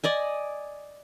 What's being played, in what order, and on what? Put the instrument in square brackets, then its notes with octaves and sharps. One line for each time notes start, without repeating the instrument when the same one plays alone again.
[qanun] D5 D#5 G#5